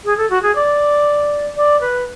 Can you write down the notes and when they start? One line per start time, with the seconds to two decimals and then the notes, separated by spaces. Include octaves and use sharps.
0.05 G#4
0.17 A4
0.30 F#4
0.43 G#4
0.55 D5
1.57 D5
1.81 B4